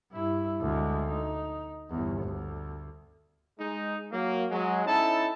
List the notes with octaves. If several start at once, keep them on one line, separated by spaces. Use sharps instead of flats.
G2 E4
D2 G#3
D#4
G1 E2
D2
G#3 D#4
F#3 A#3
F#3 G#3
C#4 D#4 E4 A4 A5